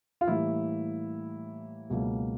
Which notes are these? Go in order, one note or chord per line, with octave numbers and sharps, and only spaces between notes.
F4
A2 E3 G3 A#3 E4
C#2 B2 F#3 A#3